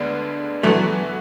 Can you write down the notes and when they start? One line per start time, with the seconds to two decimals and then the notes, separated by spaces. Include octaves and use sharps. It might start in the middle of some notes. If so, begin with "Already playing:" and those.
Already playing: D2 D3 G#3 B3 D4
0.63 E3 F#3 A3 B3 F#4